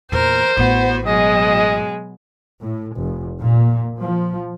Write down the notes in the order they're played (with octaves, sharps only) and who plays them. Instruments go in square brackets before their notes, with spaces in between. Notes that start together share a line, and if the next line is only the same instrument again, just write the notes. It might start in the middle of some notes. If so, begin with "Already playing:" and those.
[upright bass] E2 A#2 [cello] A#4 [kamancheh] C5
[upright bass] A1 A2 [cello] B3 F#4
[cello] B2 F#3 [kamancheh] G#3 [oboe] D#5
[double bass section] A2
F1
A#2
F3